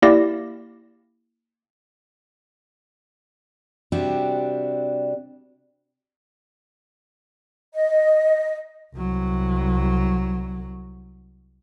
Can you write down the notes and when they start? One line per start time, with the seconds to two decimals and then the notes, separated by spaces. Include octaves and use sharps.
0.02 A#3 E4 G4 D5 A#6
3.92 C3 G3 C4 D4 F#4 G4
7.74 D#5
8.94 C2 F#3